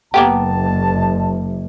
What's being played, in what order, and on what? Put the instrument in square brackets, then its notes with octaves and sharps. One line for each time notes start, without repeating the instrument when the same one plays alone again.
[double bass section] F#1 [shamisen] A#3 B3 G4 [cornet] A5